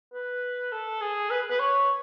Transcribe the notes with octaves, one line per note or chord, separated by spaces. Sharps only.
B4
A4
G#4
B4
B4
C#5